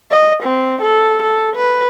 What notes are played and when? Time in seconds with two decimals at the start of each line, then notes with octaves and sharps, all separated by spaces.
0.11 D#5
0.43 C4
0.82 A4
1.22 A4
1.56 B4